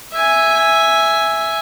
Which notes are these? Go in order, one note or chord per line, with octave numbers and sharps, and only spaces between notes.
E5 G#5